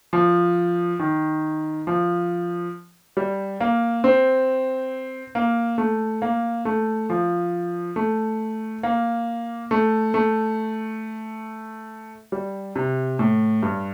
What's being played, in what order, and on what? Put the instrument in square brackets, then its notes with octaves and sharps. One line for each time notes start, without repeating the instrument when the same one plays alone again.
[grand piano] F3
D#3
F3
G3
A#3
C4
A#3
A3
A#3
A3
F3
A3
A#3
A3
A3
G3
C3
A2
G2